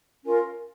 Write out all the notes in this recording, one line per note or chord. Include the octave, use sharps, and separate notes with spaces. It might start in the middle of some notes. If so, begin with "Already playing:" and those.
C#4 F4 A#4